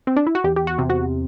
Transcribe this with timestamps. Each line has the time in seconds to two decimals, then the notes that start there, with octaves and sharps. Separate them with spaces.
0.07 C4
0.16 D4
0.27 E4
0.35 F#4
0.44 E2 G4
0.56 G4
0.67 F#4
0.78 C3
0.90 F#4